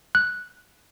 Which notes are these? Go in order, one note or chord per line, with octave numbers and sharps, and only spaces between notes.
F#6